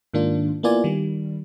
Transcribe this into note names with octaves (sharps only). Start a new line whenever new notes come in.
G#2 D#3 A#3 D4 F4
A#3 B3 E4 F4 D5 G#5
D#3 G3